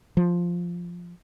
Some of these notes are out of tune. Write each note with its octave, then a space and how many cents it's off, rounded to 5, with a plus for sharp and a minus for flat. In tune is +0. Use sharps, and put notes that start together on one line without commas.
F3 +0